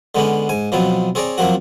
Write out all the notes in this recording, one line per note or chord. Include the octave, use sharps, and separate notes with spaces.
D3 G#3 B3 C#4 D4
G#2 G#5
B2 F3 F#3 B3 C4
C4 G#4 C#5 D5 A#5
F3 F#3 A#3 C4 F#4